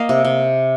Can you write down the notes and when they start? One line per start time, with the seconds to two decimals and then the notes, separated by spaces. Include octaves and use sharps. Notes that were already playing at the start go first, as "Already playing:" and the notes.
Already playing: A#3 D#5 F5
0.09 C3
0.25 C3